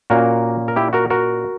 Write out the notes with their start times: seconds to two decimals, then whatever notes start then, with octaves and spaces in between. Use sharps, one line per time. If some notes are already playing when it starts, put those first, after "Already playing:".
0.10 A#2 A#3 C#4 F#4 A#4
0.68 A#4
0.76 E4 G4
0.93 F#4 A#4
1.10 F#4 A#4